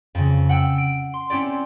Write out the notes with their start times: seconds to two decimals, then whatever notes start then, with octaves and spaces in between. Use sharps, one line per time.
0.15 F2 C#3
0.49 F#5 G5 E6
0.78 D7
1.14 C6
1.30 C4 C#4 E4 G4 D5